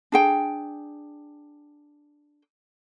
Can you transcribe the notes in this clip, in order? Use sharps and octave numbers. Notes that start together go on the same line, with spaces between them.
D4 G#4 G5